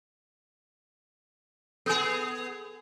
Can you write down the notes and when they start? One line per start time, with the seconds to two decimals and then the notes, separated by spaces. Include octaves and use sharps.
1.86 B3 G#4 A4 G#5